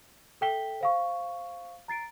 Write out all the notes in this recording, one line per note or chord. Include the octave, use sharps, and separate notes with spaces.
A4 E5 G5 B6 G7
C5 F5 C#6
A#5 A6 C7 D7